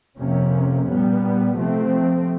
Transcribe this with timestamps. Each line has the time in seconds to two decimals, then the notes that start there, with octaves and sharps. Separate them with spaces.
0.18 F2 C3 F3 A#3 C#4
0.87 A#2 G3 B3
1.57 C3 F3 A3 C4